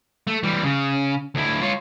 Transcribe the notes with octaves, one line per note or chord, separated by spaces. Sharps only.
A3
E3 G3
C#3
D2 E4
F4 C#5